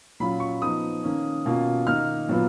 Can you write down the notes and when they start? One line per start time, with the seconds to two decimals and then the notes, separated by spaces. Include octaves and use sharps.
0.20 A#2 F#3 C#4 F4 B5
0.40 C#6
0.62 F3 B3 D#4 D#6
1.03 D#3 A#3 C#4
1.45 B2 A#3 C#4 F4
1.86 D#3 A#3 D#4 F6
2.28 A#2 F#3 B3 F4